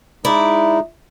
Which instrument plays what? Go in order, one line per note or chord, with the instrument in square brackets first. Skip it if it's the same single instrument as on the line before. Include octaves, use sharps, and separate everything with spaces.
[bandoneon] G#3 D#4 [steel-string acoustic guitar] E4 D5